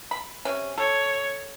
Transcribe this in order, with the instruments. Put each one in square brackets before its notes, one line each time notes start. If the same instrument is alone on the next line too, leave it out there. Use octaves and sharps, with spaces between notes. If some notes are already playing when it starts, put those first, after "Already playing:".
[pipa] B5
C3 C#4
[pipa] A4 [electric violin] C#5